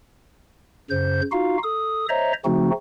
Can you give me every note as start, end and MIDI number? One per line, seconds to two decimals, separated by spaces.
0.90 1.21 42
0.90 1.21 49
0.90 1.21 72
0.90 1.21 91
1.32 1.58 63
1.32 1.58 65
1.32 1.58 66
1.32 1.58 77
1.63 2.06 69
1.63 2.06 87
2.09 2.33 72
2.09 2.33 73
2.09 2.33 75
2.09 2.33 76
2.09 2.33 82
2.45 2.71 49
2.45 2.71 53
2.45 2.71 57
2.45 2.71 60
2.45 2.71 63
2.45 2.71 66